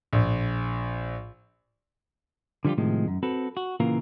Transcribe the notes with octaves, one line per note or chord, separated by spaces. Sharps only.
A#1
D3 F3 G3 F4 G4
A2 C3 D#3 F3 G#3
F#2
C4 F#4 A4 B4
F#4
A#2 C#3 E3 A#3 F4 A#4